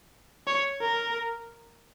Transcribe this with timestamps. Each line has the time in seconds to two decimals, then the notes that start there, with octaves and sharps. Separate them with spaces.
0.47 C#5
0.82 A#4